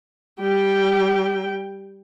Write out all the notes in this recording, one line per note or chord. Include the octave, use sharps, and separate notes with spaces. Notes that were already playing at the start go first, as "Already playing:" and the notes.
G3 G5